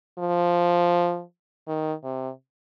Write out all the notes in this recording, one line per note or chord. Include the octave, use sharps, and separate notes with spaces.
F3
D#3
C3